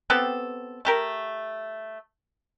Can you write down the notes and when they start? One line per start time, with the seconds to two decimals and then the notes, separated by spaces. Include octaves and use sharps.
0.10 B3 C4 G4 A4
0.85 A3 G4 A#4